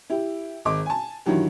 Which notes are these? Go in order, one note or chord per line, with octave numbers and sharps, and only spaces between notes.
E4 G4
G#1 D#5 D6
G#5 A5
G2 D#3 E3 F#3 G4